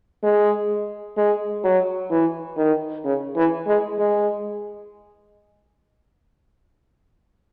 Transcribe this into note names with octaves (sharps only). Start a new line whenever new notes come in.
G#3
G#3
F#3
E3
D#3
C#3
E3
G#3
G#3